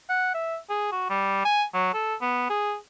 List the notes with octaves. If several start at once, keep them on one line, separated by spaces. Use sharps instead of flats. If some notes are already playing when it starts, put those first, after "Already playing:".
F#5
E5
G#4
F#4
G3
G#5
F#3
A4
B3
G#4